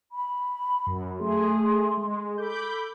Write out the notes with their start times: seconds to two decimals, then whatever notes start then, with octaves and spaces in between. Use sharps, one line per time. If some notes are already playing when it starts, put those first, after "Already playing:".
0.12 B5
0.87 F#2
1.20 A3 G#4 C6
1.97 G#3
2.38 A4 B5 D6 G6